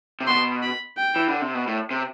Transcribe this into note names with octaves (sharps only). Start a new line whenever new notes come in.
C3
B2 C6
B5
G5
E3
D3
C3
B2
A2
C3